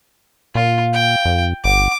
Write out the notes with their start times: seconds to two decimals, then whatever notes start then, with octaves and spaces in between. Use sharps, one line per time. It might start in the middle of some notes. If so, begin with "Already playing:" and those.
0.55 A#2 F4 F5
0.93 G5
1.25 F2
1.64 G1 F#5 D6